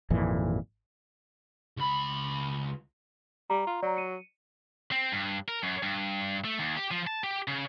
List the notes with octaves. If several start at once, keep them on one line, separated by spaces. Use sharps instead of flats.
G#1 F2 A#2 E3
C#2 B5
G3 A#5
F4
F#3 D5 A#5
C#7 D#7
C4
G2
A#4
F#2
G2
A3
D#2
G4
F3
A5
G4
C#3